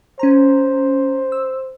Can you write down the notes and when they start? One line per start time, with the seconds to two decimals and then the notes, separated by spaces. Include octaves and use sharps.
0.19 C#4 C5 A#5
1.32 E6